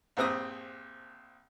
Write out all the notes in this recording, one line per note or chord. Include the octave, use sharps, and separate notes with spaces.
A#1 G2 C4 E5 D#6